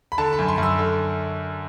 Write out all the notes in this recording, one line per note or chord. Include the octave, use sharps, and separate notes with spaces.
B5
D3 A5
B5
F#2
C6
F#2
E6
D3